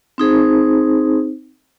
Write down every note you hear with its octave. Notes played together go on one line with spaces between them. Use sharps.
C4 D#4 G#4 C5